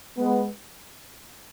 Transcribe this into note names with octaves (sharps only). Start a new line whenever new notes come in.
G#3 B3